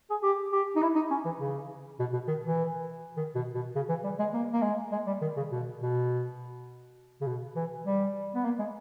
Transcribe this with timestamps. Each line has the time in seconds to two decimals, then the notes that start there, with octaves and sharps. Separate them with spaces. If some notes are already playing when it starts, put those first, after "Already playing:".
0.10 G#4
0.23 G4
0.53 G4
0.76 D#4
0.82 E4
0.96 D#4
1.10 C#4
1.25 E3
1.40 C#3
2.00 B2
2.13 B2
2.28 D#3
2.43 E3
3.17 D#3
3.35 B2
3.55 B2
3.76 C#3
3.89 E3
4.04 G3
4.19 G#3
4.34 A#3
4.53 A#3
4.62 G#3
4.92 G#3
5.07 G3
5.22 D#3
5.37 C#3
5.51 B2
5.81 B2
7.21 C#3
7.26 B2
7.56 E3
7.86 G3
8.35 B3
8.45 A#3
8.59 G#3